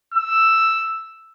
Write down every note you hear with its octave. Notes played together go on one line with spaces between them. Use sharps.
E6